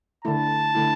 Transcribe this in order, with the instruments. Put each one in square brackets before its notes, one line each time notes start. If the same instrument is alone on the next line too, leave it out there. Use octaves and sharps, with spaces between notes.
[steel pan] D3 A3 E4 [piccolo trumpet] A5
[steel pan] D3 A3 E4